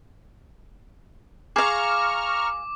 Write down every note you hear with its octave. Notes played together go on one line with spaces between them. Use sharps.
G#4 F5 A#5 C#6 D6 F6